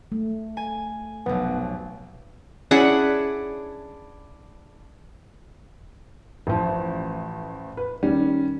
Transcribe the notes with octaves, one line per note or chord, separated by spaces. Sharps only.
A3
G#5
F1 B1 B3
C#4 D4 E4 G#4 D5 F#5
A1 F3
B4
D#3 G3 C#4